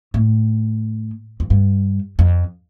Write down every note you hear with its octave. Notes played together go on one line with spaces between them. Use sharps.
A2
F2
G2
F2